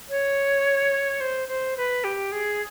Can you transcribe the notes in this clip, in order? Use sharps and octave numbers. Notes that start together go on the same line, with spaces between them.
C#5
C5
C5
B4
G4
G#4